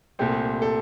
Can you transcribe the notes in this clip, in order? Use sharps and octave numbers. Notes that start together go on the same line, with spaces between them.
C2 A#2 A3 C4 G4
A4